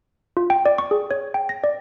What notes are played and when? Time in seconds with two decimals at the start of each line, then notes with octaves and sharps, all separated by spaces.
0.37 F4
0.50 G5
0.66 D5
0.78 C#6
0.91 G#4
1.11 C#5
1.34 G5
1.49 A#6
1.64 D5